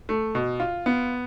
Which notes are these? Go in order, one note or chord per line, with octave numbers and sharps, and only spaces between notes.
A3
B2
F4
B3